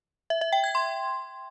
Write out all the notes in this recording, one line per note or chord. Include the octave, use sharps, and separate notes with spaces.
E5
E5
G5
G#6
C6